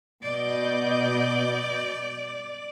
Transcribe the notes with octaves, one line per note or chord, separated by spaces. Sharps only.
B2 D5 D#5 G6